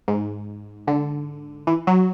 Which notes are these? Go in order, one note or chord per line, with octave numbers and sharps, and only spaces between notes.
G#2
D3
E3
F#3